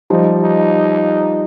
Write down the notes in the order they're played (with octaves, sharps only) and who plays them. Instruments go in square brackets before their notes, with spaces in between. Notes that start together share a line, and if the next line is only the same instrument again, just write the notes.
[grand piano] F3 G3 [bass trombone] D#4
[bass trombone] D#4